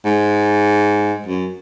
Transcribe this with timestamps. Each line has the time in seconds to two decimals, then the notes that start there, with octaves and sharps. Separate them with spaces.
0.05 G#2
1.26 F#2